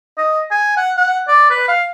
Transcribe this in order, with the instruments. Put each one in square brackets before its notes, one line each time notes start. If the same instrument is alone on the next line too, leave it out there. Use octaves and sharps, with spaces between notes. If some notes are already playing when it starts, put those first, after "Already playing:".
[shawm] D#5
G#5
F#5
F#5
D5
B4
F5